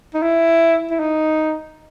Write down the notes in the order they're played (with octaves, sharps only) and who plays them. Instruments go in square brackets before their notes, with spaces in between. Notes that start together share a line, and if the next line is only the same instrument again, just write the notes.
[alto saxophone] D#4
E4
E4
D#4